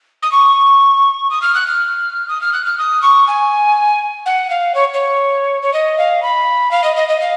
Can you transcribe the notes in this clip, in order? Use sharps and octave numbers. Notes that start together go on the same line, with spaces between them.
D#6
C#6
D#6
F6
F#6
F6
D#6
F6
F#6
F6
D#6
C#6
G#5
F#5
F5
C#5
C#5
C#5
D#5
F5
B5
F5
D#5
D#5
D#5
F5